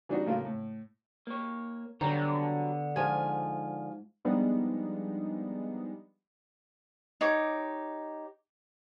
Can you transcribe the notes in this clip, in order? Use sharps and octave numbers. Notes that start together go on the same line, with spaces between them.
E3 G3 D4 D#4 F#4
A2 C#3 F#3 A3 A#3 F4
A2
A#3 C#5
D3 F#3 G3 B3 D4 A#5
G#2 F3 F4 G#5
F3 G3 G#3 B3 D4 D#4
D#4 G4 C#5 D6